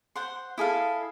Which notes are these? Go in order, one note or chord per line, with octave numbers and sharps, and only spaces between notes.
C5 F#5 C6
E4 G#4 A4 F5